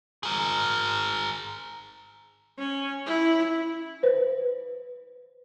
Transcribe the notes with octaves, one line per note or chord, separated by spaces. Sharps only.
G#4 A#4
C#4
E4
B4 C5